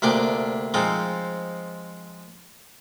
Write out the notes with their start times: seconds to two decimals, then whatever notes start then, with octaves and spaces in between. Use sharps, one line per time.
0.02 D2 C3 A#3 D4 D5 D#5
0.74 F3 G#3 C4 D#4 F4